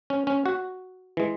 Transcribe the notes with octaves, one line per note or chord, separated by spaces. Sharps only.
C#4
C#4
F#4
E3 G#3